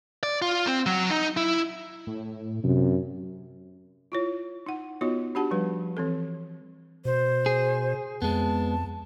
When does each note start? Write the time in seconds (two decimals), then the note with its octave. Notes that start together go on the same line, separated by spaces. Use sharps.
0.23 D5
0.42 F4
0.67 C4
0.86 F#3
1.10 D#4
1.37 E4
2.07 A2
2.64 F#2 C3
4.12 E4 F4 C#5
4.66 D#4 F#5
5.01 B3 D#4 F4 F#4 C#5 D#5
5.35 D4 F#4 G4 F#5 A5
5.51 F3 G3 B4
5.97 E3 C4 A4
7.05 B2 C5
7.46 G#4
8.22 F2 G#3 B3 A5